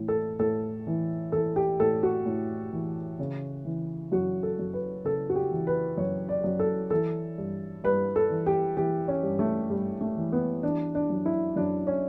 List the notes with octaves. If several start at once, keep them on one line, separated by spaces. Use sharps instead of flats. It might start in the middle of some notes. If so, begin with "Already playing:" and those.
Already playing: A2 E3
A4
A2 A4
E3
E3 A4
G4
A2 A4
F#4
A2
E3
C#3
E3
F#2 F#4
A4
F#2
B4
C#3 A4
F#4
G4
E3
B4
F#2 C#5
D5
F#2
A4
E3 A4
G2
G2 B4
A4
E3
G4
E3 G4
C#4
G2
A3
G2 G3
A3
E3
B3
E3 D4
D4
F#2
E4
F#2 D4
C#4